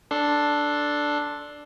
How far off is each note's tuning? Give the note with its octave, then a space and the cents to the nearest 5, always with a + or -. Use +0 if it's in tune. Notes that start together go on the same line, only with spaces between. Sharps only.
D4 +0 A4 +0 C6 +15